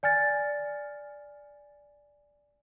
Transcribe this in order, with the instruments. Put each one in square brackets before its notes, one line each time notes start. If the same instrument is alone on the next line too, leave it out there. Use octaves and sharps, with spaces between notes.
[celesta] D5 G#5 F6 A6